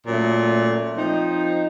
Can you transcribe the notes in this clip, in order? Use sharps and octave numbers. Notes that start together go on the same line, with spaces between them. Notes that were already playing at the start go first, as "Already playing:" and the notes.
A#2 F#3 A3 C#4
F3 C4 D#4